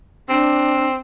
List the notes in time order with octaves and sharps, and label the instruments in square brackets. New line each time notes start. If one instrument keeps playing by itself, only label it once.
[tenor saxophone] C4 [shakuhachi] D4